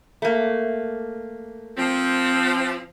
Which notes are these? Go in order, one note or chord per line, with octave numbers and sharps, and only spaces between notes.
A3 A#3
F3 C4